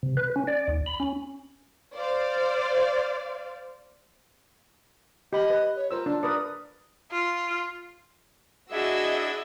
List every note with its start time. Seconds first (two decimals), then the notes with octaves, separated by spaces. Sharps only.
0.03 C3
0.17 B4
0.36 C#4
0.47 D5
0.68 D#2
0.86 B5
1.00 C#4
1.95 C5 D5 F5
5.33 G4 D#5 B5
5.50 B4
5.76 C#5
5.91 F4 A#4 C5 E6
6.06 D4
6.23 A#4 B4 D5 D#6
7.11 F4
8.72 D4 E4 F#4 G#4 D#5 E5 E6 G#6